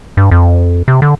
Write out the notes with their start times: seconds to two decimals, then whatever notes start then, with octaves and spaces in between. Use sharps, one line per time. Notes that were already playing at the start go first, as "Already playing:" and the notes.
0.17 G2
0.31 F2
0.88 C3
1.02 D3